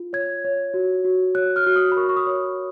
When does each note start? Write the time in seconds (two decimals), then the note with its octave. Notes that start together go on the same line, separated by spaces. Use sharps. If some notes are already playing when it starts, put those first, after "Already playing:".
Already playing: F4
0.13 C#5 G#6
0.44 C#5
0.74 F#4
1.05 F#4
1.35 C#5 F#6
1.56 F6
1.66 F#4 F6
1.76 D#6
1.92 B5
1.96 A#4 C#6
2.09 C#6
2.17 D#6
2.27 C#5